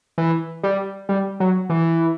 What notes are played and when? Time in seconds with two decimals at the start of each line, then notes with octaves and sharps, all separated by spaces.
0.18 E3
0.63 G3
1.09 G3
1.40 F#3
1.70 E3